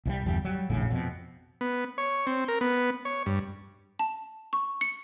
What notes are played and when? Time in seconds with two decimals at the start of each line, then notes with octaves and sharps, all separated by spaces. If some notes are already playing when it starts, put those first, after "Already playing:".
0.06 C2 E3 G3
0.26 G1 E2 G3
0.45 F#3 G3
0.70 F1 A#1 A2 C#3
0.90 F2 B2
1.61 B3
1.98 C#5
2.27 C4
2.48 A#4
2.61 B3
3.05 C#5
3.26 G2
3.99 A5
4.53 C#6
4.81 C#7